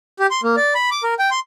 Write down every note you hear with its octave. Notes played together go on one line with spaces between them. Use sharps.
G4
C6
A#3
D5
B5
D6
A#4
G5
C6